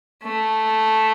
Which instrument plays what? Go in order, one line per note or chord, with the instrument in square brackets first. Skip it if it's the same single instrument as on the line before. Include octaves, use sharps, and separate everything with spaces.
[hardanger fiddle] A3